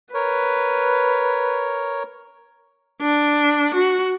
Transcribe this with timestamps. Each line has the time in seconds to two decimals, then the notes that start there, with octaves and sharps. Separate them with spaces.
0.14 A#4 B4 C#5
3.02 D4
3.74 F#4